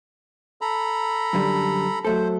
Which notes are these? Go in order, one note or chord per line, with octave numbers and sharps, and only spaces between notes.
A4 A#5 B5
F#2 D3 G3
F#3 A3 A4 C5